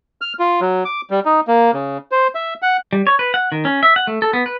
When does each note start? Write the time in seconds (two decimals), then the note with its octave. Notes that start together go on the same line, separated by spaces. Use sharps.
0.21 F6
0.39 F4
0.61 F#3
0.85 D6
1.10 G3
1.25 D#4
1.47 A#3
1.73 C#3
2.11 C5
2.35 E5
2.62 F#5
2.93 G3
3.07 C#5
3.19 B4
3.34 F#5
3.52 D#3
3.65 C#4
3.83 E5
3.96 F#5
4.07 A3
4.22 A4
4.33 B3
4.46 B4